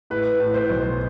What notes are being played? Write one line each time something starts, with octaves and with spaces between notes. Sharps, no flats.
A2 B4
A2
C5
B1